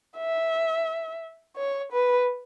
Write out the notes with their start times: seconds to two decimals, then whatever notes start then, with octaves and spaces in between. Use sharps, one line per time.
0.18 E5
1.57 C#5
1.93 B4